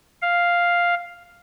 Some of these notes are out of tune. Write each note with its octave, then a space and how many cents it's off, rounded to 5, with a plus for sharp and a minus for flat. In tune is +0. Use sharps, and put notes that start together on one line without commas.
F5 +0